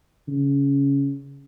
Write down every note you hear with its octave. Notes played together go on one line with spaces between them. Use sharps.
C#3